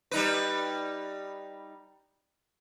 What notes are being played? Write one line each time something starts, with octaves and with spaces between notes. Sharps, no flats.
G3 D#4 B4